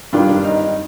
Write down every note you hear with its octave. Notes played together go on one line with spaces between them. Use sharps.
G2 D#3 D4 F4
D4
D#4
D#4